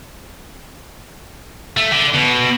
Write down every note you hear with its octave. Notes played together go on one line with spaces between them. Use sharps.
A3
D3
B2